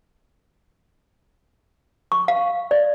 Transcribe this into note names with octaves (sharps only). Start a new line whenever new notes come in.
C#6
F5
D5